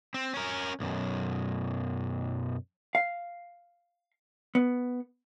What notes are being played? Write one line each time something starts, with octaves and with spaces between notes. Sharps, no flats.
C4
C#4 A#4
B1 F#2
F5
B3